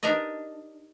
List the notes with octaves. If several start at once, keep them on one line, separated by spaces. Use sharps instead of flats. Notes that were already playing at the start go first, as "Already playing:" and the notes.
D4 D#4 G4 A#4 D5 D#5